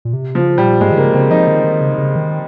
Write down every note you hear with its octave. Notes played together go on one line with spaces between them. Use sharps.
A#2
C3
C#3 F3
A#2 G3
G#2 G#3
D#3
C#3 A#3
C#3 C4
F3 D#4
D#3
D#3
C#3
C#3
D#3